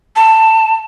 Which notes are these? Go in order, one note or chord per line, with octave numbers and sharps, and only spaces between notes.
A5